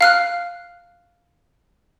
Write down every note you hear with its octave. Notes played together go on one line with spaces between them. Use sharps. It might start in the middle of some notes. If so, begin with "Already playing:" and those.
F5 F6 F#6